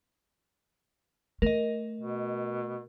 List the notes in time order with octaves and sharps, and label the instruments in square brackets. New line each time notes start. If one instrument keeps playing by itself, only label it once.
[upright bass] A3 [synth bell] A#4 D#5
[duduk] B2